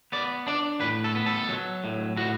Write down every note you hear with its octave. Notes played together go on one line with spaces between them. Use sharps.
B3 D5
D4 D5
A2 B4
A4
B3
A4
F#3
A2
A2 F#4